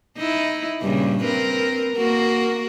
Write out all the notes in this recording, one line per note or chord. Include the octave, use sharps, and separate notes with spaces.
D#4 E4
G2 A#2 C#3
C4 A#4 B4
A#3 F#4 A#4